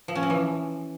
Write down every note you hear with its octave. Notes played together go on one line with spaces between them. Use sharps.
F3
C#4
F3
E3